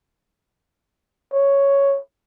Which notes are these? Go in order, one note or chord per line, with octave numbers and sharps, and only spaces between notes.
C#5